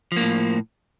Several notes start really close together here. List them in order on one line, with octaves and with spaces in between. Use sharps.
F3 A#3 A2